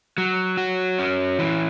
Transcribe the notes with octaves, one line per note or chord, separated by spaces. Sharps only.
F#3
F#4
C#4
E3